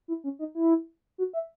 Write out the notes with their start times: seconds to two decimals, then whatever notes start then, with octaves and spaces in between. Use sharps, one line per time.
0.08 E4
0.24 C#4
0.39 D#4
0.55 E4
1.18 F#4
1.33 E5